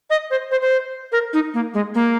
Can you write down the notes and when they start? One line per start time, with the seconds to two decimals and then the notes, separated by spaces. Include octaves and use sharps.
0.10 D#5
0.31 C5
0.51 C5
0.62 C5
1.12 A#4
1.33 D#4
1.54 A#3
1.74 G#3
1.94 A#3